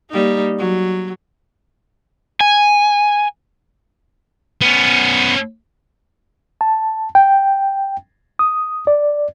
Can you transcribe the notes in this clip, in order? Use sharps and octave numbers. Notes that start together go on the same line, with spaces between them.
G3 A#3 D#4
F#3
G#5
B3 C#4
A5
G5
D#6
D5